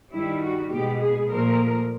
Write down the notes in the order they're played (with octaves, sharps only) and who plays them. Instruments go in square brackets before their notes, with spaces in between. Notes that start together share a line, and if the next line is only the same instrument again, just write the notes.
[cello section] G2 D#3 G3 E4
F#4
B2 G#3 B3 G4
G#4
A#2 F3 A3 A#4